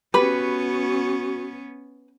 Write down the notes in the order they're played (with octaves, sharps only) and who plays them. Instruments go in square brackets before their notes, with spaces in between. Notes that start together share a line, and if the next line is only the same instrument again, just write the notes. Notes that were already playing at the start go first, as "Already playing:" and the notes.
[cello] B3 C#4 [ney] F#4 [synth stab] G4 B5 [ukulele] B4